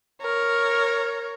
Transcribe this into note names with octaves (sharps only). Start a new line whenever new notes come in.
A#4 C#5